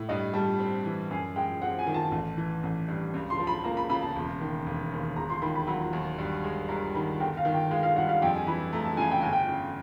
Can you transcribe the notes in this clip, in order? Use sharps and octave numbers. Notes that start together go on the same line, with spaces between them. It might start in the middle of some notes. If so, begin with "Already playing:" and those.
Already playing: A2
G2 D#5
G3 A5
C4
E3
F#2 G#5
G#3 G5
C4 F#5
G#5
D#3
A5
A1
E3
A1
G2
C#2
C6
F3
B5
A#3 A#5
B5
C#3 B5
A5
E1
D#3
E1
D#2
E1 A#5
C6
D#3 B5
B5
F#3 B5
D#2
G2
G#3
G2 A#5
D#3 B5
G1 G5
F5
D#3
G5
G#3 F5
F5
G2 F#5
F5
F2 G5
G#5
E3 B5
A3 A#5
A5
C#3 G#5
G5
G1 G#5
G5
C#3